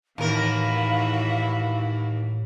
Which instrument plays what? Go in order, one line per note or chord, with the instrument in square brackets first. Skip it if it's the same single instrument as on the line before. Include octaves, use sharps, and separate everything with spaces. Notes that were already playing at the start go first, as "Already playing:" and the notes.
[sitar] D#2 A#4 [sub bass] A2 [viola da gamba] E3 E4 F#4 [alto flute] F5